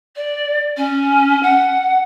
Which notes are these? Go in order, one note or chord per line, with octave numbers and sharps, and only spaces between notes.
D5
C#4
F#5